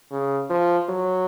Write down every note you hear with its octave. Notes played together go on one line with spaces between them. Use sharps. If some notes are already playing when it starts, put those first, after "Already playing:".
C#3
F3
F#3